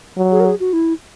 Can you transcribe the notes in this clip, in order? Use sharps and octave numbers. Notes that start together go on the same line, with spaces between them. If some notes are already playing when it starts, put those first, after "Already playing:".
F#3
G#4
A#4
G#4
F#4
E4